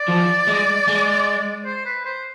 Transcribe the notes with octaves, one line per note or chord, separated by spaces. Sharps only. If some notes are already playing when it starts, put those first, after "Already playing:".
Already playing: D5
F3
G#3
G#3
C5
B4
C5